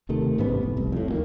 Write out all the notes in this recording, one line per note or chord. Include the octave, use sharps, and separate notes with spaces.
D#2 C3 D#3 A3
A1 G#2 C3 B3
F1
C2
F2 A2
D#2 D#3 A#3